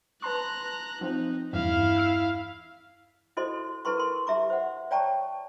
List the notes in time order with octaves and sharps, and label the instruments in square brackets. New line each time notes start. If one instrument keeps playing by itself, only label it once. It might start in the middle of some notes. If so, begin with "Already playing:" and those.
[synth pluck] B4 A5 C6 [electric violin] A#5 F#6
[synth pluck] F3 C4 [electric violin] D#4
[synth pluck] E2 G2 E3 [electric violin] E4 F5
[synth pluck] E6 F6 C7
[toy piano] E4 F#4 A4 C5 D#5 C6
E4 A4 B4 A#5 C6 C#6
A#4 C6
G4 E5 A#5 D6
C5 F#5
C#5 D5 G5 A5 A#5 C#6